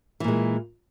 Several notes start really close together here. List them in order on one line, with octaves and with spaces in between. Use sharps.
E3 A#2 G#3